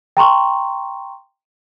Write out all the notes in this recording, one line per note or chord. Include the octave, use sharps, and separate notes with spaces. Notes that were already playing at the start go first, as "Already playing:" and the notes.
G5 A#5 C6 C#6